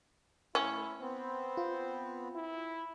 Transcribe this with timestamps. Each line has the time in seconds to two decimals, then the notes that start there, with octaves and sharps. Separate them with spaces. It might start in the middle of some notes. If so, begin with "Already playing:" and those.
0.55 A2 C#4 E4
1.00 B3 C4 C5
1.57 F4
2.36 E4